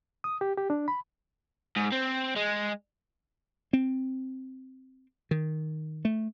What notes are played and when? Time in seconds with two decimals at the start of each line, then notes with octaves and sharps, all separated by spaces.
0.24 D#6
0.41 G4
0.58 G4
0.70 D4
0.88 B5
1.77 G#2
1.92 C4
2.36 G#3
3.73 C4
5.31 D#3
6.05 A3